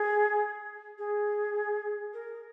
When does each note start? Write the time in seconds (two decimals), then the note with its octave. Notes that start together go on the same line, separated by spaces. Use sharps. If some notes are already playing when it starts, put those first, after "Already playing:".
Already playing: G#4
0.98 G#4
2.13 A#4